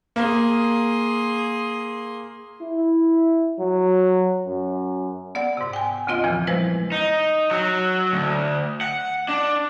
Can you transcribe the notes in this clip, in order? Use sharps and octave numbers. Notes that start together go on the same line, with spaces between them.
A#3 G#4 C6
E4
F#3
F#2
B3 D5 F#5
G#2 C3
G5 G#5
D2 C#3 B3 C4 F4 D#5
E2 A#2 C#3 E3 F3
F3 G3 G#3 E4 B4 C5
D#4
F#3
D2
F#5
D4